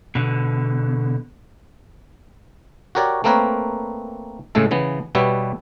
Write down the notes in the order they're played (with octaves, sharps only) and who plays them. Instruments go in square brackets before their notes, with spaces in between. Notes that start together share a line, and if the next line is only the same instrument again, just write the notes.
[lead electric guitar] B2 D3
[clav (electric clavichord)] F#4 G4 A#4 C#5 D5
A3 A#3 C4 A#4 B4 C#5
A2 C#3 G#3 A3 A4
C#3 E3 B3
B2 G3 B3 C#5 E5